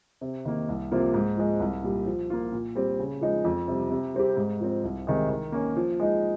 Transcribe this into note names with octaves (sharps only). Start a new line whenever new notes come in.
C3
D#3 A#3
C2
C3 F3 A#3 F4
G#2
F3 G#3
C2
A#2 G3
F3
A#3 F4
A#2
G3 C4
C#3
F3 G#3 D#4
F2
C3 G3
C3
G3 C4 G4
G#2
F3 C4
C2
C3 D#3 G#3
D#3
A#3 C#4
F3
G#3 D#4